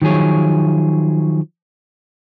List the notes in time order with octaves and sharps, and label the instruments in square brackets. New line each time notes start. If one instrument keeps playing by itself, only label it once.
[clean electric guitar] D#3 F3 F#3 G#4 C#5